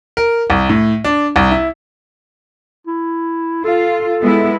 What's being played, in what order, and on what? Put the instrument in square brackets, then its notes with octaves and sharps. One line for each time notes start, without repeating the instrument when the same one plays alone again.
[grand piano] A#4
C2
A2
D4
C2
E4
[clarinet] E4
[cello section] F4 [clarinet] A4
[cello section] G#3 B3 E4